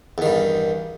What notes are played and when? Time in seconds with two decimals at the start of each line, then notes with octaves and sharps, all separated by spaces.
0.18 E2
0.22 D#3
0.26 G2